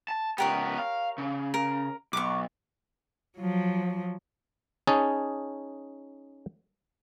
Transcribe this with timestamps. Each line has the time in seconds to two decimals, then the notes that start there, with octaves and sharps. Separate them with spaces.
0.08 A5
0.38 C#2 B3 G4 A#4 C#5
0.78 F5
1.18 C#3
1.54 A#4
2.13 B1 C#6 D6
3.38 F3 F#3
4.87 C#4 D#4 G#4 A5